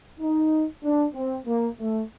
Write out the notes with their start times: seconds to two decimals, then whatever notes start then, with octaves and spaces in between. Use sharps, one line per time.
0.20 D#4
0.83 D4
1.15 C4
1.46 A#3
1.79 A3